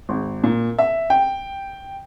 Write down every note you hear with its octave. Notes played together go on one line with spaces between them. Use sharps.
G#1
A#2
E5
G5